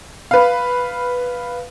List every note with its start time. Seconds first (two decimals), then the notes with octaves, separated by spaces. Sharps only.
0.31 B4 F5